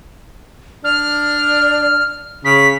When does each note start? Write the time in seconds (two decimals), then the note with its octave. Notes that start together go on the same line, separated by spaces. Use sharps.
0.84 D4 F6
2.45 C#3 B6